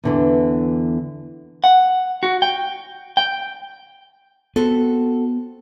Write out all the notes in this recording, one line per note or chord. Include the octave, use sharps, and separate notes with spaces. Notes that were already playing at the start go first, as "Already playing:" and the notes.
E2 D3 E3
F#5
F#4
G5
G5
B3 C4 F#4 A4